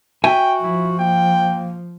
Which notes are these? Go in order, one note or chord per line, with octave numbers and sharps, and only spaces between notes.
F#4 E5 G5 G#5
F3 E4
A#3 G5